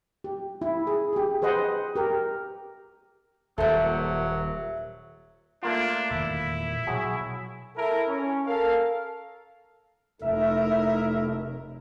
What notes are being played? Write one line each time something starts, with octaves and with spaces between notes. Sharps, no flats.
G4
E4
G#4
G4 G#4
G#4 B4 C5 D#5 F#5 C6
G4 A#4
D#1 A#2 F#3 A4 C5 E5
A3 A#3 D4 F4
E1 A#2 D#3 E4
B2 F#3 F#4 G#4 C#5
E4 A4 A#4
C#4
A4 A#4 F5
F1 A3 D#4 E4 A#4 E5